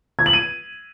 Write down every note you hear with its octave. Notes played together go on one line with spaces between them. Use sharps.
G#6
F#7
D#7